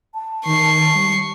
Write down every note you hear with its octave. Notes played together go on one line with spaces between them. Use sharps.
A5
D#3 C#6 C7
G3